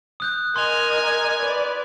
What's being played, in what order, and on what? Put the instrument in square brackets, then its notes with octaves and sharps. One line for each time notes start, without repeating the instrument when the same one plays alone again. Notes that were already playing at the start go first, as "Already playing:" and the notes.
[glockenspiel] D#6 F#6 G6
[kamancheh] A#4 D#5 [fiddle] G#5 [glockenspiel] C6 F7
[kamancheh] B4 D5